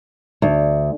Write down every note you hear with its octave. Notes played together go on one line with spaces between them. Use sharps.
D2